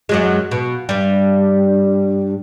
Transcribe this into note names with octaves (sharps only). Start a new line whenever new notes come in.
F#2 F#3 G#3
B2
G2 G3